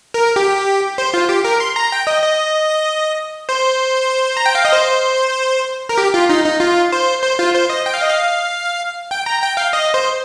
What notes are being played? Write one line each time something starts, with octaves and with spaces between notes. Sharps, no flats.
A#4
G4
C5
F4
G4
A#4
C6
A#5
G5
D#5
D#5
C5
A#5
G5
F5
D#5
C5
A#4
G4
F4
D#4
D#4
F4
C5
C5
F4
C5
D#5
G5
F5
D#5
F5
G5
A#5
G5
F5
D#5
C5